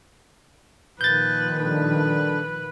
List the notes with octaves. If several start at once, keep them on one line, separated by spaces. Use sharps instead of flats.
A#2 D#3 F3 B4 G6 A6
G3 D4 A4 B4